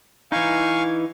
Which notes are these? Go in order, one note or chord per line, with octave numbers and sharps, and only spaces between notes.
E3 D#4 F5 G#5 C#6